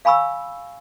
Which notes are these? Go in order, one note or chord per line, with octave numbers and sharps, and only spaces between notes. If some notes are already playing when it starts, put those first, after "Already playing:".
F5 G#5 B5 C#6 E6